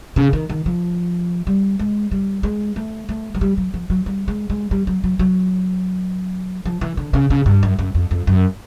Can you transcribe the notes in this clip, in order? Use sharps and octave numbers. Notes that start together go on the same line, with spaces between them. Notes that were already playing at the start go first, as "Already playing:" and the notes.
C#3
D#3
D#3
F3
G3
G#3
G3
G#3
A3
A3
F#3
G3
F#3
F3
F#3
G3
G#3
G#3
G3
F#3
F#3
F#3
F3
E3
D3
C#3
C#3
G2
F#2
F#2
F2
F2
F#2